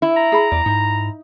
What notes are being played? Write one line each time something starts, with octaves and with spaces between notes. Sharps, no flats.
E4
A#5
G#4 B5
E2 D5
G#2 D#4